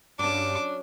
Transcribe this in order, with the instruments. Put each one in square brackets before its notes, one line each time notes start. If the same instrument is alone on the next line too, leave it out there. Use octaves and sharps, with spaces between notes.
[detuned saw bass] G2 [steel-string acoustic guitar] F#3 C#4 [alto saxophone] D4 [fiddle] A5 D6